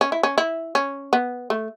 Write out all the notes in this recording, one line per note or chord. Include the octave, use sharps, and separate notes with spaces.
C#4
E4
C#4
E4
C#4
B3
A3